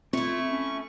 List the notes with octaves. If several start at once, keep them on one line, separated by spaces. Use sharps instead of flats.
A3 C4 E4 F4 C#6
C#4